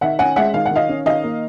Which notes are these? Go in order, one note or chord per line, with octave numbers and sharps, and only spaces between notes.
D#3 E5 F#5
C#4 F#5 G#5
G#3 E5 F#5
D#3 F5
F#5
D#3 D#5 F5
C#4
D#3 D#5 F5
A#3